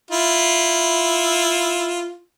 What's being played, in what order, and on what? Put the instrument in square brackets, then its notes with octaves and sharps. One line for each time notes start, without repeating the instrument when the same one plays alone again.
[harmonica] E4 F4